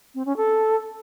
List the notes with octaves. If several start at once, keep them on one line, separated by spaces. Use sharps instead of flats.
C4
C#4
A4